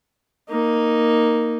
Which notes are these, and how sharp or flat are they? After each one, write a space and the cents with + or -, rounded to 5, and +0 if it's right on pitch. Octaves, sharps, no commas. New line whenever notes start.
A#3 +0 D#4 +0